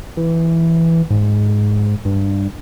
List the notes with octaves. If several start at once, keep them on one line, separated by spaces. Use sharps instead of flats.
E3
G#2
G2